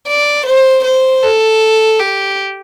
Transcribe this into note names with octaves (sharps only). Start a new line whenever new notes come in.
D5
C5
C5
A4
G4